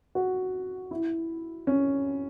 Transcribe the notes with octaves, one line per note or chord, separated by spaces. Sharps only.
F#4
E4
C#4